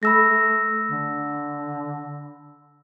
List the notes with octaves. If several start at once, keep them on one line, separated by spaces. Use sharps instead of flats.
A3 B5 E6 A#6
D3